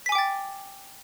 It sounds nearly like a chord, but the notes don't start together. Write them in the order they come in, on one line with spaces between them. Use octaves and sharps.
B6 G#5 D6 G5 A6